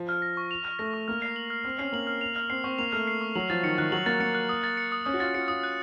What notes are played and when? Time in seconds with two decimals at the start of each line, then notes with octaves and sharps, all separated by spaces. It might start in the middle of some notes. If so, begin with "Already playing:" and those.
Already playing: F3
0.09 F6
0.22 A#6
0.37 C#6
0.51 F7
0.65 F6
0.79 A3 A#6
0.94 C#6
1.08 A#3 F6
1.22 C7
1.36 F#7
1.50 F6
1.65 C4 F6
1.79 C#4 C7
1.93 A#3 F#7
2.07 F6
2.21 F7
2.36 F6
2.50 C4 C7
2.64 C4 C#6
2.79 A#3 F7
2.92 A3 F6
3.07 C7
3.21 C#6
3.35 F#3 F#7
3.50 F3 A6
3.63 D#3 C#7
3.78 D#3 F#6
3.92 F#3 F#7
4.06 A#3 A6
4.20 A#3 C#7
4.35 F#6
4.49 D#6
4.64 A6
4.77 C#7
4.92 D#6
5.05 C#4 D#6
5.14 F#4
5.20 F4 A6
5.34 F#4 C#7
5.48 F4 D#6
5.63 F#6